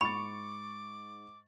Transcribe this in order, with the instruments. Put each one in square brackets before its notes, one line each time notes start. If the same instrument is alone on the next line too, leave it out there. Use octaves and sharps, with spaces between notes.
[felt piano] G#2 A6 [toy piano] B5 [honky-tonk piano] C#6 [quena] D6